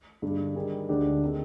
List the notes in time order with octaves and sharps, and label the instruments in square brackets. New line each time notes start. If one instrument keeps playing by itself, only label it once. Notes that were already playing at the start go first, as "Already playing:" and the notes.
[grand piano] G2 D3 G#3 D4
D#3 G3 D4 G#4
D2 D3 G#3 D4 G4
D#3 G#3 C4